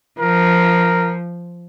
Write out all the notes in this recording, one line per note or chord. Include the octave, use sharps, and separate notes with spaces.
F3 A#4